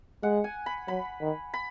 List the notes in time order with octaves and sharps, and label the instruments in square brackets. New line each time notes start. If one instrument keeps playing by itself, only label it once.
[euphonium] G#3 [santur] F#5
[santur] G#5
B5
[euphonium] F#3 [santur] B5
[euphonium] D#3
[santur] B5